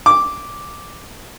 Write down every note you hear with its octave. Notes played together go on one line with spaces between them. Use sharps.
D6